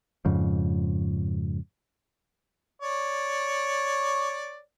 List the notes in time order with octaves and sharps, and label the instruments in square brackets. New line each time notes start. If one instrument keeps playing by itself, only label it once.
[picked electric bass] F2 G#2 C#3 F3
[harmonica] C#5 D5